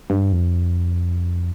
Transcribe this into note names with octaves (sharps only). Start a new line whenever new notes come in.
G2
F2